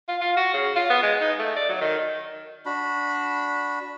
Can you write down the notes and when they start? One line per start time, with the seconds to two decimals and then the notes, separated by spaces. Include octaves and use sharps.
0.08 F4
0.21 F4
0.37 F#4
0.53 C#3
0.76 F4
0.90 B3
1.03 G#3
1.21 D#4
1.39 A3
1.56 D5
1.69 F#3
1.81 D#3
2.66 D4 F#4 B5